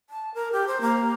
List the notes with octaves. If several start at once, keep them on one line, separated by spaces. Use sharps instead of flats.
A5
A#4
G4
C5
A#3